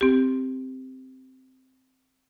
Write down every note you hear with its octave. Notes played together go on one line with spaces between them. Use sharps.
C4 G4